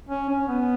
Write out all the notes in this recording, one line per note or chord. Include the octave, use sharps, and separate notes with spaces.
C#4
C#4
B3